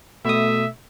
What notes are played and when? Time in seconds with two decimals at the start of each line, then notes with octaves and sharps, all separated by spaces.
0.25 B2 A3 E5 D#6